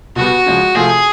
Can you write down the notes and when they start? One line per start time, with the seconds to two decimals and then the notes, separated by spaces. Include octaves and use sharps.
0.16 B2 G3 B3 F#4
0.46 C#3 F3 G#3
0.75 C3 F3 A3 C4 F4 G#4